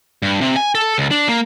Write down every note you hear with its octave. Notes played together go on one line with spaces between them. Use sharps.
G2
C3
G#5
A4
C#2
D4
A#3